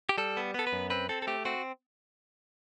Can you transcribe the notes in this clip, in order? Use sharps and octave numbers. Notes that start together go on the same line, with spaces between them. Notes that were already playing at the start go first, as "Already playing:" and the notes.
G4
G3 A4
B3
B3 A4
B4
F#2
C4 B4
C4 A4
A4
A3 G4
C4 F#4